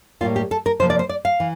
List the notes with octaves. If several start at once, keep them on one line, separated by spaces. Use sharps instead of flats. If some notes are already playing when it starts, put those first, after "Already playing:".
A2 G3 A#3 F4
G4
A4
A#4
C3 F3 A#3 C5
D5
C5
D5
F5
E3